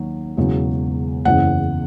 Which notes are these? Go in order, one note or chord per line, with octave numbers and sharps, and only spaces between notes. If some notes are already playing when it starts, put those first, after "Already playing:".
Already playing: D#2 D#3 F#3
E1 E2 C#3 F#3
F#1 E2 C#3 E3 F#5